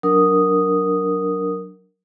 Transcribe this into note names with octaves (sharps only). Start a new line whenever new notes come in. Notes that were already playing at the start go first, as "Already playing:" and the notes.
F#3 D4 A#4 D#6